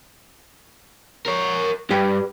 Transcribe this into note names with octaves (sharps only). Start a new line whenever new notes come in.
A#4 C#5
G2 G4 B4 G5